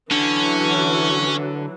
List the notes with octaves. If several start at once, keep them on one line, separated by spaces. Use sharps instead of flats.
D3 E3 F#3 C#4